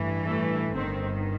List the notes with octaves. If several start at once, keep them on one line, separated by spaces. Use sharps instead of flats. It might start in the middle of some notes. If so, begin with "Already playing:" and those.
Already playing: A1 G2 E3
A3
G1 G2 D#3 C4